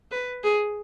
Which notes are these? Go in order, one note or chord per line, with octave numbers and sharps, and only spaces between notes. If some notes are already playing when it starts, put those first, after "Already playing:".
B4
G#4